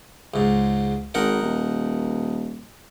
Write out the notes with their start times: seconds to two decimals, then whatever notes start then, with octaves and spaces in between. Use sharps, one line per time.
0.34 C#2 G#2
1.14 G#1 D#4 A#4 F#5
1.42 D#1